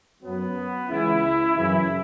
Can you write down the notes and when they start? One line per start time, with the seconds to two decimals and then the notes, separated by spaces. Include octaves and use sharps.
0.21 F#2 F#3 B3
0.89 C#2 C#3 E3 E4
1.55 F#2 C#3 E3 E4